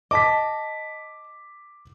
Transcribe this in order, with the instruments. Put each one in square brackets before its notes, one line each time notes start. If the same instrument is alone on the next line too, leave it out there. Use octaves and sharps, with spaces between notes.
[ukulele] D#5 A5 [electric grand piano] D6 B6